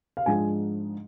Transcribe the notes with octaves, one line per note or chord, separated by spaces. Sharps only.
F5
G#2 F3 G#3 D4 G#5